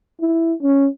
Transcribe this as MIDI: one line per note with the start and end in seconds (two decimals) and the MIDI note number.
0.21 0.53 64
0.62 0.88 61